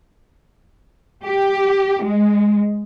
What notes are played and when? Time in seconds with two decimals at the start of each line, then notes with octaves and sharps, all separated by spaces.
1.25 G4
2.03 G#3